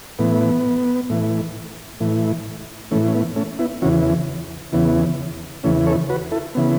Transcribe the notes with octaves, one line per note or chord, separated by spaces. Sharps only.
A2 E3 B3
A2 E3
A2 E3
A2 E3 A3 C#4
C#4
B3
A3 C#4
B3 E4
E2 C#3 E3 C#4 F#4
E2 C#3 E3 B3
E2 C#3 E3 A3 C#4
A4 C#5
F#4 B4
E4 A4
C#3 E3 B3